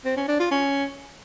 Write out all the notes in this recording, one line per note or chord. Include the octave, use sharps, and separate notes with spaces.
C4
C#4
D4
F4
C#4